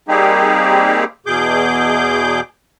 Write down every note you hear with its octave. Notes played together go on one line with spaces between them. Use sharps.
G3 A#3 C4 D#4 G4 G#4
E2 B2 G#4 D6 G6